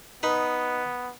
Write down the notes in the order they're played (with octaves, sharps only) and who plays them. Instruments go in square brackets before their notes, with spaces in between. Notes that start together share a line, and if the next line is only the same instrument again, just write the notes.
[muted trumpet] B3 [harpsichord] D#4 B4 B5